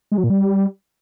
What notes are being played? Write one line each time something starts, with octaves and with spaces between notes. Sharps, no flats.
G#3
F#3
A#2
G3